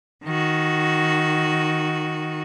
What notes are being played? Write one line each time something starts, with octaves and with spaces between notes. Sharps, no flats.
D#3 F#4